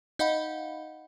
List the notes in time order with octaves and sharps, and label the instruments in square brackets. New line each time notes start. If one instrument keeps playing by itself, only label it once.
[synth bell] D#4 D#5 F5 F#5 B5